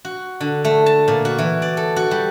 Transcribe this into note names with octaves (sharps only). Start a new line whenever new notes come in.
F#4
D3
A3
A5
A#2
F#4
E3
D5
A4
F#4
G3